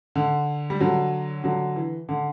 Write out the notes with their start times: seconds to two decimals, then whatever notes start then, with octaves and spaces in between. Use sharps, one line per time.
0.15 D3
0.70 G3
0.80 D3 F#3
1.44 D3 F#3
1.76 E3
2.09 D3